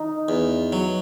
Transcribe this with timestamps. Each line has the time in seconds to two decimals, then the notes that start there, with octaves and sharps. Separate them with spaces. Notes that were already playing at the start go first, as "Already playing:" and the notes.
Already playing: D#4
0.29 E2
0.73 F#3